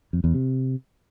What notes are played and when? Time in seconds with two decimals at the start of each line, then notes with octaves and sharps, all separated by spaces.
0.13 F2
0.24 E2
0.34 C3